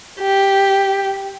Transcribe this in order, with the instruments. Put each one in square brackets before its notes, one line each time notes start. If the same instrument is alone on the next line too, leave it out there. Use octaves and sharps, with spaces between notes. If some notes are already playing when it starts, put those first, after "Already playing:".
[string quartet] G4